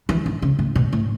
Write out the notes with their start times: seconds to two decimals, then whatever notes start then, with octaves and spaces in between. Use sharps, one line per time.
0.09 E3
0.26 D#3
0.42 C#3
0.59 A2
0.75 B2
0.93 A2